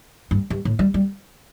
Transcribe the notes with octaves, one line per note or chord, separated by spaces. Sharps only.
G2
G2
A2
G3
G3